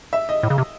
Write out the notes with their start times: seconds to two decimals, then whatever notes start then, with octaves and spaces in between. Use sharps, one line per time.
0.13 E5
0.29 D#5
0.43 A2
0.50 C#3
0.58 C3